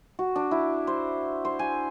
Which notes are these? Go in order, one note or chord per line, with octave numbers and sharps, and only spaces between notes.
F#4
D4
E4
C5
C5
G#5